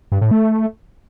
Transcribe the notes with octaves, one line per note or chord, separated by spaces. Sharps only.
G2
A2
A3